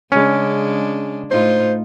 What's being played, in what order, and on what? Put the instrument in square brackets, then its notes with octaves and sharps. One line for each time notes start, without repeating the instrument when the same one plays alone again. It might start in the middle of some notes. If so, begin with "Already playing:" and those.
[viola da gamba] C#3 G#3 D4 [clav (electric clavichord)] C#4
[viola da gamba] A2 D#4 F4 [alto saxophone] C5